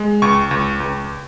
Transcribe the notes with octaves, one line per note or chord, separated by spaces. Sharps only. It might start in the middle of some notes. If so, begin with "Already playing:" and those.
Already playing: G#3
C#2 C#6
C#2
C#2